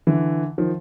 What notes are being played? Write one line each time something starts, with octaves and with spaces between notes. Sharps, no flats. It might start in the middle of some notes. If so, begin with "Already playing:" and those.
D3 E3
D#3 F3